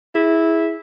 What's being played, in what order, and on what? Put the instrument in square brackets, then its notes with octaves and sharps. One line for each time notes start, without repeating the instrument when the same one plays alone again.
[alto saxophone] E4 [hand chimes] G#4